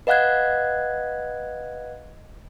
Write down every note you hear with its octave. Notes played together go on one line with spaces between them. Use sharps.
B4 D#5 F5 F#5 F#6 G#6